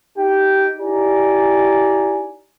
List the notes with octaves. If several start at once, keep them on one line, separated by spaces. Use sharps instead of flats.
D#4 G4 G5
D#4 E4 G4 D5 G#5 A#5